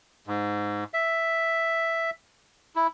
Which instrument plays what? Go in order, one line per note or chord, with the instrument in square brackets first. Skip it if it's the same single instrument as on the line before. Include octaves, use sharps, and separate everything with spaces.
[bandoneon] G#2
E5
E4